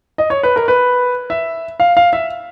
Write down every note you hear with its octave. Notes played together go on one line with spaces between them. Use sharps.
D#5
C#5
B4
A#4
B4
E5
F5
F5
E5